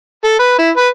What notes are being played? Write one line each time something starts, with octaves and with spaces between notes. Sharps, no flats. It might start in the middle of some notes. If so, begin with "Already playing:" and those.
A4
B4
E4
B4